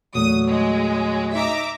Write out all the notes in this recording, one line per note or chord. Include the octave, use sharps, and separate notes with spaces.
E2 A#2 F#3 A3 D#6
G#3
D#4 E5 A#5 D6